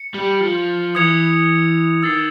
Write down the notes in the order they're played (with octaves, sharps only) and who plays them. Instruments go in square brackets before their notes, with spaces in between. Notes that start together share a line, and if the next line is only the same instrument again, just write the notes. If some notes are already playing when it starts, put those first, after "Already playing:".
Already playing: [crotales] C#7
[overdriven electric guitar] G3
F3
[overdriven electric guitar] E3 [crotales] D#6 G#6 C#7 F7
[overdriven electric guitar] D#3 [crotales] E6 A6 C7